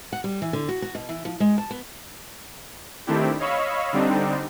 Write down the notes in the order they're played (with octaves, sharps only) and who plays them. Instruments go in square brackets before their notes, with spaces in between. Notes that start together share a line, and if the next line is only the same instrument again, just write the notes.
[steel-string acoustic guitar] F#5
G3
E3
D3
F#4
F#4
B2
E3
F3
G#3
A5
B3
[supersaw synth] D#3 A3 C4 D4 E4 G4
C#5 D#5 F5 B5 C#6 E6
D3 G3 C4 D4 D#4